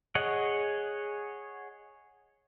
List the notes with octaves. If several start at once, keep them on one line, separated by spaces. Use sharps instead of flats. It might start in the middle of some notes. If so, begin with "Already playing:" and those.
G#4 C#5 D#5 F#5